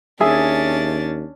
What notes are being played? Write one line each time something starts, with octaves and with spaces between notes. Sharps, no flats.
D#2 C#4 D4 G#4 E5 G#5 A6